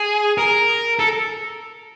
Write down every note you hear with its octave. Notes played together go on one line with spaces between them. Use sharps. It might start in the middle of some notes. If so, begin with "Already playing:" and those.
Already playing: G#4
A#4
A4